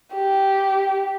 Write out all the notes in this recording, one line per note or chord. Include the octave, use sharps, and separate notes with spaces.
G4